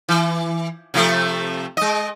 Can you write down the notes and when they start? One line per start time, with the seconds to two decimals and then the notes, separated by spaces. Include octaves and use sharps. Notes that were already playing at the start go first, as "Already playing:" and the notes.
0.09 E3
0.94 C3 F3 A3
1.77 G#3 D#5